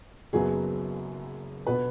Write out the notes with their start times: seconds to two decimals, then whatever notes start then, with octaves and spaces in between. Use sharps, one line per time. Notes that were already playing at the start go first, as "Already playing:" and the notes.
0.33 F#1 F#2 F#3 B3 G#4
1.67 B2 B3 B4